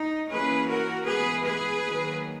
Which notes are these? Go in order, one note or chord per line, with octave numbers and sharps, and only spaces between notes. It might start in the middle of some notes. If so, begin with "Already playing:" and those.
Already playing: D#4
E3 A#3 C#4 G#4 B4
F#4 A#4
E3 G#3 B3 G#4 B4
G#4 B4
D#3 F#3 A#3